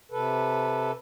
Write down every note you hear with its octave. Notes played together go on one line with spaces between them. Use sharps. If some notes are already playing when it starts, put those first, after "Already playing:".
C3 A4 B4